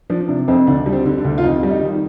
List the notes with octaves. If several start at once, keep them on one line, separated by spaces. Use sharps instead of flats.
F3 D4
C3 D4
F2 C4
D2 D4
G3
C4
D3
D4
D2
F4
F2 D#4
G3
D#4
D#3